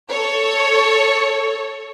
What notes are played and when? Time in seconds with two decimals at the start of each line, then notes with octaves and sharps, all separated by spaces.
0.10 A4 C#5